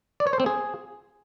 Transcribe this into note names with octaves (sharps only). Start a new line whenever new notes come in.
D5
C#5
C5
C4
G#4